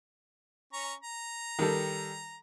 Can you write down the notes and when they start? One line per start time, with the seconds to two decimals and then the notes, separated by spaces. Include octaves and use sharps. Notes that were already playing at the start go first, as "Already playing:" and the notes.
0.73 C#4 A#5 C#6
1.03 A#5
1.59 D#3 G3 A4